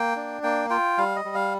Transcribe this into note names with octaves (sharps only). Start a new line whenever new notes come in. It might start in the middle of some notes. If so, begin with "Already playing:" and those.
Already playing: A#3 G5
D4
A#3 G5
F4 G5
G3 F5
D#5
G3
F5